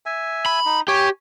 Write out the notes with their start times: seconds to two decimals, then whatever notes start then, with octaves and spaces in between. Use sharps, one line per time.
0.06 E5 G#5
0.46 B5
0.66 D#4
0.88 G4 C#5 G#5